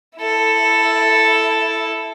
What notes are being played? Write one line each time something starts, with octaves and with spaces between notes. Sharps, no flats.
E4 A4